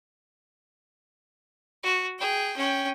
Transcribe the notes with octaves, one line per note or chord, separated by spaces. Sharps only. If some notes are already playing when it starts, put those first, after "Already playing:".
F#4
G#4 G5
C#4 G5